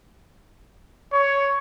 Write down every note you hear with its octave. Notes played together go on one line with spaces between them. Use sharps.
C#5